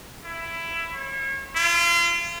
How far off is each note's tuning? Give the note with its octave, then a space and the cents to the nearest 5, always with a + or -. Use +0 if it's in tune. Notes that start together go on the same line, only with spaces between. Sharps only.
E4 +15
C#5 -35
F4 -35